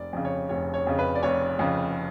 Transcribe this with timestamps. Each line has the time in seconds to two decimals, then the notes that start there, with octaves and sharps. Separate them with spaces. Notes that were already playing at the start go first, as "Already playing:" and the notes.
Already playing: F1 D5
0.13 F2 C#3
0.25 C#5
0.49 F1 C#5
0.74 C#5
0.87 F2 C#3
0.99 B4
1.15 D5
1.23 F1 C#5
1.59 F2 C#3